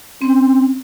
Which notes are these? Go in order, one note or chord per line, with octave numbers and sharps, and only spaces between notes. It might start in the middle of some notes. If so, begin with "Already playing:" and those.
C4 C#4